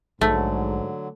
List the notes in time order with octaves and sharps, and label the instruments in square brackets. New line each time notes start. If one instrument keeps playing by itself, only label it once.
[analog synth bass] A#1 [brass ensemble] G#2 [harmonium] D3 F#3 [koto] A3